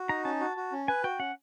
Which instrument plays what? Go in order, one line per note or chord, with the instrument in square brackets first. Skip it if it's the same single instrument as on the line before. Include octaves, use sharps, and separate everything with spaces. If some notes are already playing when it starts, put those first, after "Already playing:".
Already playing: [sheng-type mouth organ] F#4
[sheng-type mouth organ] D#4 [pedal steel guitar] A#5
[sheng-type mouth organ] C#4 [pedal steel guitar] A5
[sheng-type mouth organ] F#4
F#4
C#4
[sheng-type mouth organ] B4 [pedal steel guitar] G#5
[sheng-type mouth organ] F#4 [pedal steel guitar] G5
[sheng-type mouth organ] C#4 [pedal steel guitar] F#5